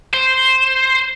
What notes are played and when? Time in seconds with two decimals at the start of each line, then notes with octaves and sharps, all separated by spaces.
0.14 C5